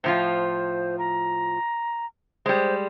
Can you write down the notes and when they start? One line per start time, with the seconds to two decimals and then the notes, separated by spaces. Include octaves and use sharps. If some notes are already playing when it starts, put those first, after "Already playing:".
0.04 A2 F3 F4 C5
0.99 A#5
2.46 G3 G#3 C5